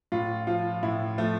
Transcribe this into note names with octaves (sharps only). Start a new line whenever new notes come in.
A2 F4
F3 F4
A2 E4
F3 A3